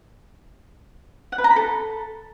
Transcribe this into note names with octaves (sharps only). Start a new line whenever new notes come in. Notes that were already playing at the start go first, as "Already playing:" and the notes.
F#5
B4
A#5
B5
A4